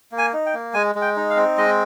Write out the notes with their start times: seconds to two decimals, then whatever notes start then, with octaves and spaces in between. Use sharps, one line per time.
0.12 A#3
0.18 G#5
0.33 D#4
0.46 G5
0.54 A#3
0.74 G#3 G#5
0.95 G#3
1.01 G5
1.16 D#4
1.30 F5
1.37 C4
1.58 G#3 D#5